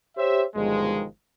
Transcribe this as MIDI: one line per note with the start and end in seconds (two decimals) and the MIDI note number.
0.17 0.43 67
0.17 0.43 72
0.17 0.43 73
0.17 0.43 76
0.55 1.04 31
0.55 1.04 47
0.55 1.04 51
0.55 1.04 53
0.55 1.04 56